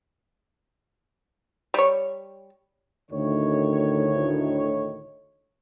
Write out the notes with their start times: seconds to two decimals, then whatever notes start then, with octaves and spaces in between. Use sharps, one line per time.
1.74 G3 C#5
3.11 D2 A2 D#3 C#5